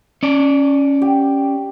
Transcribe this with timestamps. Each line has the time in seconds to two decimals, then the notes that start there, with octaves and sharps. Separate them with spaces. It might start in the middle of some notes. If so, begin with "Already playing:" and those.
0.23 C#4 D5
1.02 G4